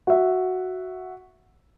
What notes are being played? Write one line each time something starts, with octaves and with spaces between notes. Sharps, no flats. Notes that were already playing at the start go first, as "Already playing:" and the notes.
F#4 E5